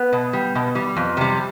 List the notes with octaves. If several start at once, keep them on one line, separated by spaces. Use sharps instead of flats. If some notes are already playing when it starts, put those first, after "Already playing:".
Already playing: B3
B2
G3
B2
G3
F2
C3 G3